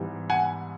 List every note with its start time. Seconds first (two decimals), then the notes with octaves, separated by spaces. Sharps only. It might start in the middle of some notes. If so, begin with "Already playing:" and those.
Already playing: G#2 E3 G3 B3
0.30 F#5 G#5